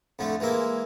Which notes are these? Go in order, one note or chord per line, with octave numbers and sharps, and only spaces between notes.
F2 D3 A3
E3 G#3 A#3 E5